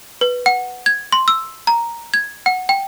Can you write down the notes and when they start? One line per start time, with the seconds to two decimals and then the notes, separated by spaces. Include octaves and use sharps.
0.21 B4
0.46 F#5
0.86 G#6
1.12 C6
1.28 E6
1.67 A#5
2.14 G#6
2.46 F#5
2.69 G5